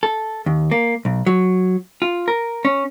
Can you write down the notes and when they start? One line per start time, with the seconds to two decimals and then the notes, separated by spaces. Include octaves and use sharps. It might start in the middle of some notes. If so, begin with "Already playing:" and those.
0.03 A4
0.46 D#2
0.71 A#3
1.05 B1
1.26 F#3
2.02 F4
2.28 A#4
2.65 C#4